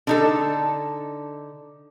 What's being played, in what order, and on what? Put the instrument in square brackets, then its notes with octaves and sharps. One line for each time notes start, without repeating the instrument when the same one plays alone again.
[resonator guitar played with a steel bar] D3 D#4 A4